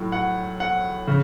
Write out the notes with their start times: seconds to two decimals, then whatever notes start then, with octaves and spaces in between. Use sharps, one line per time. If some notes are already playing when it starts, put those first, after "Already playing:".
Already playing: A2 F#3
0.12 F#5
0.60 F#5
1.07 C#3